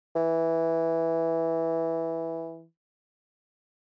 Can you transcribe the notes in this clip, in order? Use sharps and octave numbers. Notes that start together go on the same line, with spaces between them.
E3